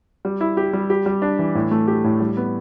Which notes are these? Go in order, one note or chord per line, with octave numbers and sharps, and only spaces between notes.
G3
E4
G4
G3
G4
G3
D4
E3
A2
A3
G4
A2
G3
B3